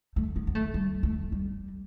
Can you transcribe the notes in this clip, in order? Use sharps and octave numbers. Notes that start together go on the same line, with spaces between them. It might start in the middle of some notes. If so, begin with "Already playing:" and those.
A3
B3
B3
A3
G3
A3
G3